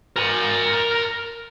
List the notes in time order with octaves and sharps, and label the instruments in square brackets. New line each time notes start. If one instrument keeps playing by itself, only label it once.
[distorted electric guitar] A#4 G#5